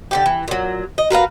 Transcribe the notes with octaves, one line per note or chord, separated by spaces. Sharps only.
D3 E3 G4
E3
A#2 F#3
D#5
F#4 A#4 B4 F5